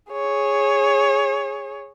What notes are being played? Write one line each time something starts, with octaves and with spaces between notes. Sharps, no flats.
G#4 C#5